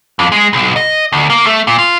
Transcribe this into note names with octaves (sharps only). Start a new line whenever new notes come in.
F2
G#3
B1
D#5
D2
A#3
A3
A#2
F4